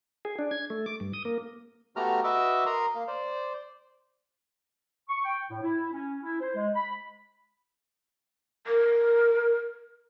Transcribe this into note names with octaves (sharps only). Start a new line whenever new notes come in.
G#4
D4
G#6
A3
D6
G2
D#6
A#3
A3 B3 F#4 G4 A#5 F6
F#4 B4 D#5 E5 D6 E6
A#4 A#5 C6 D#6
A#3 F5
C5 D5
C#6
G5
A2
E4
C#4
E4
C5
G#3
B5
A#4